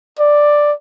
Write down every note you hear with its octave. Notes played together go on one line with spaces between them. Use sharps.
D5